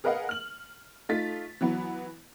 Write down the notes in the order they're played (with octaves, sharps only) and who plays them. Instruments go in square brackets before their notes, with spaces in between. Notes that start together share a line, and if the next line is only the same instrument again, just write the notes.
[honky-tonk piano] G#4 A#4 B4 D#5 F5 F#5
F6 F#7
A3 D#4 F4 A6 B6
E3 F#3 B3